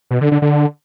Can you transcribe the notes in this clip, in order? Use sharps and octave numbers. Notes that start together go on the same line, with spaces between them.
B2
D3
D3
D3